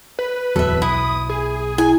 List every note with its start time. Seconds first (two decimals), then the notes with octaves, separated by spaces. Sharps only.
0.19 B4
0.56 D1 E2 F#3 A4 E5
0.82 B1 E4 D#6
1.30 G#4
1.78 E4 G#5